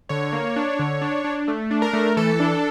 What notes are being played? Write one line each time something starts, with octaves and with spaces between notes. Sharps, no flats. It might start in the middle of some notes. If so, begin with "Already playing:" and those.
D3 C#5
A#3
D4
D3
D4
D4
A3
D4
A#4
A3
E3 A4
D4